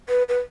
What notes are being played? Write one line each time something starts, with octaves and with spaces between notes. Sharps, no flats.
B4
B4